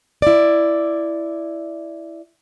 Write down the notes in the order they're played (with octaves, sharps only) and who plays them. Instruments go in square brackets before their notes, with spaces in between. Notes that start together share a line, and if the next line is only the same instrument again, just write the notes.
[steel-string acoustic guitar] E4 D5